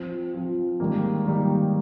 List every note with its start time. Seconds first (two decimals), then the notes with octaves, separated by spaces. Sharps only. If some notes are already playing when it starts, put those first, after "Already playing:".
Already playing: F3 C4 F4
0.34 F3 C4 F4
0.80 G#2 D#3 G3 A#3
1.25 G#2 D#3 G3 A#3